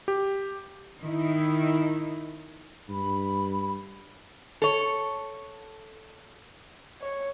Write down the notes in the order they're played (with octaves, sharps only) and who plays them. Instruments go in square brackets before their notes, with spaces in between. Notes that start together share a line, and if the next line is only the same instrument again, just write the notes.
[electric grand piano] G4
[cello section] D#3 D#4 E4
[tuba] G2 [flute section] B5
[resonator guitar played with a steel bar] A4 C#5
[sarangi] C#5